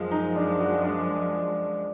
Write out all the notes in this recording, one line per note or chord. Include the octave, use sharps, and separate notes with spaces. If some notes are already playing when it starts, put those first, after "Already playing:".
Already playing: F#2 F3 G#3
D#4
D4
F#4
D4